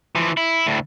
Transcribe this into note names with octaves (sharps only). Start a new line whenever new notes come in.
E3 F3
E4
D2 A2